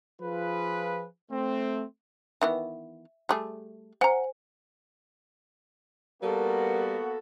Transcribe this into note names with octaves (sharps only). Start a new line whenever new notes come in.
F3 F4 G#4 B4
A3 C4
D#3 E3 B3 E5
G3 A3 G#4
C5 F#5 G#5 A#5
G3 A#3 B3 F#4 A4 A#4